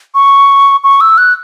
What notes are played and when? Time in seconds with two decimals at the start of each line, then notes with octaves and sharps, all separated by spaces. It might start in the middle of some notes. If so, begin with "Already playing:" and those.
0.15 C#6
0.84 C#6
1.01 E6
1.18 F#6